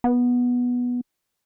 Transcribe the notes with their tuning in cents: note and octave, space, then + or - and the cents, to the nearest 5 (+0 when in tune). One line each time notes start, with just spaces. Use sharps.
B3 -10